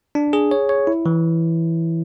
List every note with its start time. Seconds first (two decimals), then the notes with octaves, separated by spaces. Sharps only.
0.15 D4
0.33 G#4
0.51 C#5
0.69 C#5
0.87 E4
1.06 E3